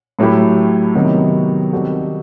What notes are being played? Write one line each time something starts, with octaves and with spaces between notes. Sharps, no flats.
A2 F#3 A3 E4 G4
C3 D#3 F#3 B3 F#4
D#3 G3 C4 F#4 A4